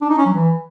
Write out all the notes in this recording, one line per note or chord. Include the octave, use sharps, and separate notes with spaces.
D4
D#4
C#4
F#3
E3